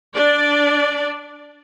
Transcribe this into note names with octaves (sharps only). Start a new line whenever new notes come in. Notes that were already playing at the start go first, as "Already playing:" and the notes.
D4 D5